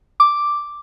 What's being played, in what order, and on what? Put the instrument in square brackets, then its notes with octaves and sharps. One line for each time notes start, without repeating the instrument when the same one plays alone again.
[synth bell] D6